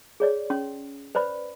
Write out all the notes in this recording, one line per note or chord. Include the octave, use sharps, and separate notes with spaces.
G#4 C#5 D5
C#4 C6
B4 C5 D5 B5